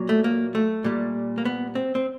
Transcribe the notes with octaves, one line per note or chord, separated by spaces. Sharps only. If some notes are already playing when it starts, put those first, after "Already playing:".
Already playing: A#2 F#3
A3
A#3
A3
A#2 G3
A#3
B3
C4
C4